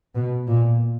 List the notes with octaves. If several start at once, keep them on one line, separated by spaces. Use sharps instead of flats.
B2
A#2